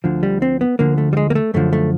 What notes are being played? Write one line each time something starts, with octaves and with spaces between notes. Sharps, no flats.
D2 D3 F3
G3
C4
B3
D2 D3 F3 A#3
A3
G3
G#3
A#3
A3
F#2 D3 F3 A3
A3